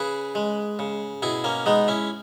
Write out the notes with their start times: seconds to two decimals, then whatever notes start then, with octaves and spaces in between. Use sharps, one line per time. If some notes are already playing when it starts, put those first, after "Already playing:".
Already playing: C#3 G#4 B4
0.35 G#3
0.79 C#3
1.22 B2 E4 G#4
1.44 A#3 C#4
1.66 G#3 B3 D#4
1.88 C#4 E4